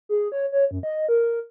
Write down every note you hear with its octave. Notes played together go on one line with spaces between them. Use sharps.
G#4
C#5
C#5
F#2
D#5
A#4